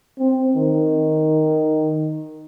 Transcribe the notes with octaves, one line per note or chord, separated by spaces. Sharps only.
C4
D#3